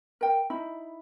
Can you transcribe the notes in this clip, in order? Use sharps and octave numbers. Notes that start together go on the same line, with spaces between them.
A#4 G5
D#4 E4 B5